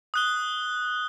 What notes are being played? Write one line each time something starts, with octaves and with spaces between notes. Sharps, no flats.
D#6 F#6 G7